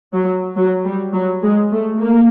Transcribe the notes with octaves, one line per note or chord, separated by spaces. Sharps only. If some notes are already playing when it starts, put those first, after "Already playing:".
F#3
F#3
G3
F#3
G#3
A3
A#3